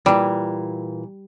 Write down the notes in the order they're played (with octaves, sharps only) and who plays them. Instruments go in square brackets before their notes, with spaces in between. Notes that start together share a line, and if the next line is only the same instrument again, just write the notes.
[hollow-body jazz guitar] A#2 E3 [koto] G3